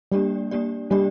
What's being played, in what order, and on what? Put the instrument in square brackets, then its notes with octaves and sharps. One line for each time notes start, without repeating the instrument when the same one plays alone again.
[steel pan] G3 [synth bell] A#3 D4 G4 D5
[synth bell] A#3 D4 G4 D5
[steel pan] G3 [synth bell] A#3 D4 G4 D5